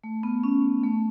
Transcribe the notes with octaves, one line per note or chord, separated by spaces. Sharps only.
A3
B3
C#4
A3